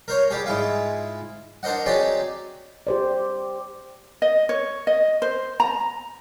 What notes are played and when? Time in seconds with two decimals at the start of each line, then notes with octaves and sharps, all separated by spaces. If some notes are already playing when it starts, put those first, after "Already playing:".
0.08 A#4 C5 C#5
0.30 G3 G4 G#4
0.46 G#2 G#3 E4 F4
1.63 D4 A#4 C5 D#5 F#5
1.86 F#3 C4 D#4 G4 G#4 D5
2.87 G4 C5 D5
4.22 D#5
4.49 C#5
4.87 D#5
5.22 C5
5.60 A#5